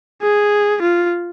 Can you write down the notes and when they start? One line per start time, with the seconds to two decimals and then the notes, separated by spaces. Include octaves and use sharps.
0.22 G#4
0.82 F4